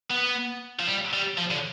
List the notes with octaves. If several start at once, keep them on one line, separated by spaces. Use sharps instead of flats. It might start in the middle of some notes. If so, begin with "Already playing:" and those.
B3
F3
G3
G3
F3
D3